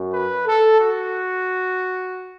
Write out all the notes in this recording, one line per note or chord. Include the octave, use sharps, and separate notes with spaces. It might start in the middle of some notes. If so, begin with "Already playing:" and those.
Already playing: F#2 F#3
B4
A4
F#4